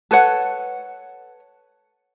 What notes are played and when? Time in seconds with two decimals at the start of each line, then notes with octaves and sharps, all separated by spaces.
0.11 A4 B4 C#5 F#5